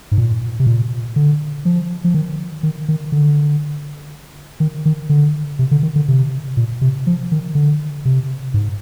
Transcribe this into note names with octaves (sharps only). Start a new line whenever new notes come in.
G#2
A#2
C3
A#2
D3
F3
F3
D#3
D#3
D#3
D3
D#3
D#3
D3
C3
D3
D#3
D3
C3
A#2
C3
F3
D#3
D3
C3
G#2